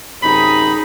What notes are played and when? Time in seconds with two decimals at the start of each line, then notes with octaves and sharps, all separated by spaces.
0.22 F#2 C3 D#4 G#4 B5